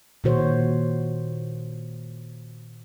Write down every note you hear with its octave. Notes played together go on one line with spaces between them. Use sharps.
A#2 D#3 F#4 C5 C#5